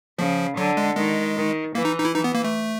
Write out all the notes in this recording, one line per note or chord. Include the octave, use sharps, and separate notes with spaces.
C#3 F3
D3 F#3
G#3
D#3 G#3
D#3
E3 A#3
D#4
D#4
E4
E3 D#4
B3
A#3
A3